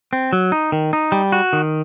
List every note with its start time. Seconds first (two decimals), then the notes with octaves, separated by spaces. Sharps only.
0.13 C4
0.33 F#3
0.52 D#4
0.72 D#3
0.93 D#4
1.12 G3
1.32 F#4
1.53 D#3